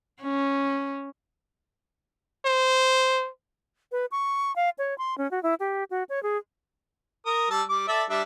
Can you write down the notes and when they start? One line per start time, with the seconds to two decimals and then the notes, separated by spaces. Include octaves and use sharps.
0.22 C#4
2.45 C5
3.92 B4
4.12 C#6
4.56 F5
4.78 C#5
4.98 C6
5.18 C#4
5.31 F#4
5.43 E4
5.60 G4
5.90 F#4
6.09 C#5
6.23 G#4
7.26 A#4 D#6
7.50 G3 A5 E6
7.69 G3 D6
7.88 A4 D5 E5
8.10 G3 D4 E5